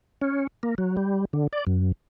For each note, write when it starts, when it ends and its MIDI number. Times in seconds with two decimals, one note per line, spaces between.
0.21 0.47 61
0.63 0.75 58
0.78 0.96 54
0.97 1.25 55
1.33 1.47 50
1.53 1.64 74
1.67 1.92 42